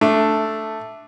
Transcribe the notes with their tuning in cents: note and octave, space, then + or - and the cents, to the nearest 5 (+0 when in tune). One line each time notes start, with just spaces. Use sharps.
A3 +0 D4 +0